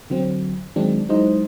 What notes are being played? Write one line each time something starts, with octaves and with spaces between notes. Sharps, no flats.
D3 F#3 C4
D#3 F#3 G#3 C4 D4
F#3 G#3 D#4 E4 C5 D#5